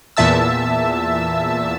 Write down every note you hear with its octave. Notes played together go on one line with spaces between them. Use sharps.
E2 A#2 E5 A5 E6